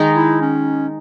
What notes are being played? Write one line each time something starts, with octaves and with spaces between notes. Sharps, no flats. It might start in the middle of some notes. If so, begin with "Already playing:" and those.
Already playing: D#3 G#3 D#4
E4
C#4